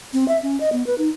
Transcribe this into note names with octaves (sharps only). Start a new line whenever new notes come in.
C4
E5
C#4
D#5
B3
B4
D#4